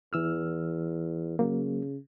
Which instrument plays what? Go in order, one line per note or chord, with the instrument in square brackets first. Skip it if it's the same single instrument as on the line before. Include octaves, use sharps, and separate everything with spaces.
[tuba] E2 [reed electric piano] E3 E6 F6
[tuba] C#3 [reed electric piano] F#3 A#3